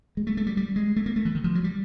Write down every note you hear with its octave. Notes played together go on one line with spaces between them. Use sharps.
G#3
A3
A3
G3
G3
G#3
A3
A#3
A3
E3
D#3
F3
F#3
G3